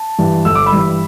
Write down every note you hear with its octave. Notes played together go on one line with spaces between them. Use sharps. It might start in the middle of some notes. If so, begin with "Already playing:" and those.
Already playing: A5
G2 E3 G3
G1 E6
D6
B5 E6
G2 E3 G3